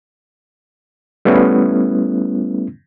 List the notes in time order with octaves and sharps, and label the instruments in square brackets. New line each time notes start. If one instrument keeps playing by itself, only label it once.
[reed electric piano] G3 A3 B3 C#4 E4